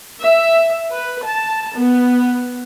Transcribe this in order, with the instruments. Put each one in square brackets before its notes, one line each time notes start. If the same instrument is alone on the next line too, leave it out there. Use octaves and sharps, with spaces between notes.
[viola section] E5
B4
A5
B3